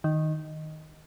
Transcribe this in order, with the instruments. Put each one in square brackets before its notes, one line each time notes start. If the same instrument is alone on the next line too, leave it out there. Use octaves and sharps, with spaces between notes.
[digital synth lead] D#3